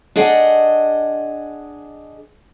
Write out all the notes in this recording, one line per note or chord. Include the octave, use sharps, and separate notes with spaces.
D4 G#4 D#5 F#5